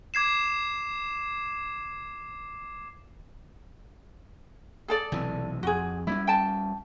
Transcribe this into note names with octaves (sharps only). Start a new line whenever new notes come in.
D6 G#6 C7 E7
G#4 A4 D5
B1 C3 E3
F2 F#4 G#4
G3 A3 C#4 E4
G5 A5